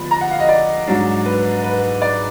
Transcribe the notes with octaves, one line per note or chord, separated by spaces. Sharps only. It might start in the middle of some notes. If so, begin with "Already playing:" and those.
Already playing: D3 F3 B3 D4 B5
A#5
F#5
F5
D#5
D5
G#2 F#3 D4
B4
B4
D5